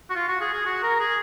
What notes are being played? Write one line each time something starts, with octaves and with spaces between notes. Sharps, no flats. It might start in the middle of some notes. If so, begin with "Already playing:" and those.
F#4
F4
F#4
G#4
G#4
F#4
A#4
G#4